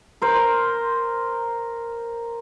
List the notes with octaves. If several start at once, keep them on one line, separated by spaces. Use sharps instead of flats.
A#4 C5